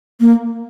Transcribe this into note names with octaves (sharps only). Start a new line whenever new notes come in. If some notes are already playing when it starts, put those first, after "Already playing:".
A#3